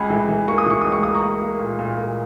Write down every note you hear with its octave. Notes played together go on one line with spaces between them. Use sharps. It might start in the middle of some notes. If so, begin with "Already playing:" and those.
Already playing: C#2 G#5 B5
E3
E3
A#3 C#6
D#6
E3 C#6
C#2 D#6
C#6
A#3 D#6
A#5 C#6
A#3
A#3
A#2
A#2
A#2